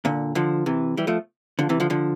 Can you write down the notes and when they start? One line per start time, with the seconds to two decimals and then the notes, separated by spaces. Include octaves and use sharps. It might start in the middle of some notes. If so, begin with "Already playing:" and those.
0.05 A#2 D3
0.35 D3 F3
0.66 C3 E3
0.97 E3 G3
1.07 F3 A3
1.59 D3 F3
1.69 C3 E3
1.80 D3 F3
1.90 D3 F3